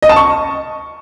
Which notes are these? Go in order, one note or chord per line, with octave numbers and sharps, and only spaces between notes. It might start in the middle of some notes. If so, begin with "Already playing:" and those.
D#5
A5
C#6